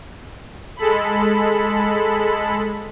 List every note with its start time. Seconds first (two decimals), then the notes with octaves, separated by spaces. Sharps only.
0.77 G#3 A4 B5